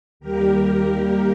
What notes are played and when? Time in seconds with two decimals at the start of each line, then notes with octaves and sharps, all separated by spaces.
0.20 D#2 D#3 G3 A#3 G4 A#4